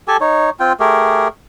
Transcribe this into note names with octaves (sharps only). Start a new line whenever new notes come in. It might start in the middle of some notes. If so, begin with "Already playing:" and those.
G4 A4 G#5 A5
D#4 C#5
C4 F4 G5
A3 G4 G#4 A#4